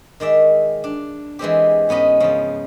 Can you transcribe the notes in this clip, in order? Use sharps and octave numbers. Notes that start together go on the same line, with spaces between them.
D#3 G#3 D5 E5
D4
E3 G#3 C4 G4
G#2 B3 C#4 D#5 B5
C#3 F3 F4